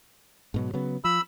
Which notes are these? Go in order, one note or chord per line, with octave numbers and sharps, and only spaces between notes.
G#2 B2 F#3
C#3 F#3 B3
F3 B5 E6